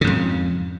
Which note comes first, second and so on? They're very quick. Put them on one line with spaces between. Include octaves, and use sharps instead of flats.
C#3 G#2 F2